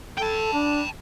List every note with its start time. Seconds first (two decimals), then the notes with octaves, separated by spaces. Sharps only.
0.18 A4 G5 A5
0.53 D4